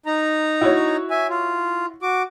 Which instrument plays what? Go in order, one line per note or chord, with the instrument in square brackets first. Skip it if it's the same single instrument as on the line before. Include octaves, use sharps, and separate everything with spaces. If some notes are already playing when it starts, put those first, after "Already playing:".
[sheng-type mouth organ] D#4 A#5
[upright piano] E4 F#4 C#5
[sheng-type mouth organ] E5 G#5
F4
F#4 D6